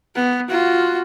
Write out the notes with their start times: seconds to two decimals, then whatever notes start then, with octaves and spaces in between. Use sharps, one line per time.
0.16 B3
0.49 F4 F#4